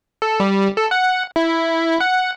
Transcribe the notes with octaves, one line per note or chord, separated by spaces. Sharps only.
A4
G3
A4
F#5
E4
F#5